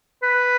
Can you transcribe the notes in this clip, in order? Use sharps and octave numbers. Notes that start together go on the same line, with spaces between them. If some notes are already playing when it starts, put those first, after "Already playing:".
B4